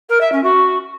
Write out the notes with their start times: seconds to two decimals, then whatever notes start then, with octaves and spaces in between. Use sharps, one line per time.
0.09 A#4
0.20 E5
0.32 C#4
0.43 F#4